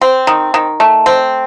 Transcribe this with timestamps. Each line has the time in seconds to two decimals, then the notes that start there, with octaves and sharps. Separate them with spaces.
0.01 C4
0.27 D#3
0.54 D#3
0.80 A3
1.06 C4